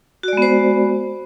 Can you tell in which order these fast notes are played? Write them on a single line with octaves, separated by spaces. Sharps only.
F#4 D5 G#3 B3 C5